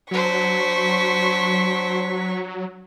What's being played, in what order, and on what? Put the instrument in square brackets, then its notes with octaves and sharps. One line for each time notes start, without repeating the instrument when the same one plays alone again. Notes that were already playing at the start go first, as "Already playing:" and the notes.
[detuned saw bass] F#3 [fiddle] D4 C5 [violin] C#6 B6